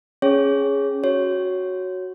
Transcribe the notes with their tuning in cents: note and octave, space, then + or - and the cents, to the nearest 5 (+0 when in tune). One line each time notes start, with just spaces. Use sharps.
C#4 +0 G#4 +0 C#5 +0
F#4 +0 C#5 +0